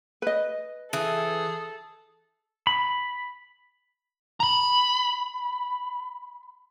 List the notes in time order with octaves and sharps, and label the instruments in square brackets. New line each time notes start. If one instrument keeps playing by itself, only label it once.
[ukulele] B4 D#5
[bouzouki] E3 [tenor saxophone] G#4 [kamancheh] A4
[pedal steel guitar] B5
[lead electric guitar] A#5 B5